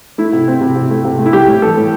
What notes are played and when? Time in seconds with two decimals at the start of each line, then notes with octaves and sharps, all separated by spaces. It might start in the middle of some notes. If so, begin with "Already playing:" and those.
0.18 A3 E4
0.33 C3
0.48 C4
0.61 C3
0.76 C3
0.91 A3
1.05 C3
1.19 A3
1.26 E4
1.33 G3 G4
1.48 A2
1.62 E3 A4
1.77 A2